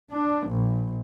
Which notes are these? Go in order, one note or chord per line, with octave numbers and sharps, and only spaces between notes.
D4
A#1